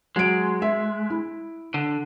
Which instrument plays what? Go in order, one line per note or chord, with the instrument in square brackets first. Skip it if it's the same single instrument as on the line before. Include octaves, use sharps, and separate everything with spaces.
[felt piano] F#3 D7 [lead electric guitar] G#3
[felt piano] E5
E4
[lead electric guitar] D3